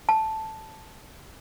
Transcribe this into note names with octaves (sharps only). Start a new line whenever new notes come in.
A5